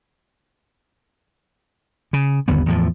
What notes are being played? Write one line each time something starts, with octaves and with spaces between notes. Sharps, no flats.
C#3
G1 D#2 D3 B3
E2 A2 F3